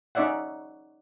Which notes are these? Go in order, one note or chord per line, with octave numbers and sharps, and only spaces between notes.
C#4 D#4 C#5 D5 E5 F#5